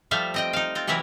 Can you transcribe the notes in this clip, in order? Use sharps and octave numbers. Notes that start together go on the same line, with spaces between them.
F3 G3 A3 C5 E5 F5
C4 D#5 G5
D#4 F5
C4 F4
C3 E3 F#3 E4 A#4 B4